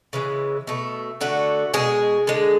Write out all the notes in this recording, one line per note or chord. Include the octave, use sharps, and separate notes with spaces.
C#3 E3 G#3
B2 A3
D3 A3 F#4
B2 G#3 G#4
D3 G#3